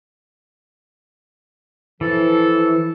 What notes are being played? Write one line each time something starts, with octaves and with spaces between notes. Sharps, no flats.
E3 F3 A4